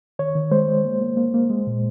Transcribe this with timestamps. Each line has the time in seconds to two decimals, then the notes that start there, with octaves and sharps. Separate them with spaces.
0.19 D#3 C#5
0.35 D#3
0.51 G#3 C5
0.69 G#3
0.85 A#3
1.01 A#3
1.17 A#3
1.34 A#3
1.50 G#3
1.67 A#2